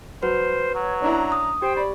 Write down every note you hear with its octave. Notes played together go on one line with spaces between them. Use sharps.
F#3 B4 C5
F#3 C#5
C#4 D4 E4 A#5
D#6
G4 C5 G5
D5 B5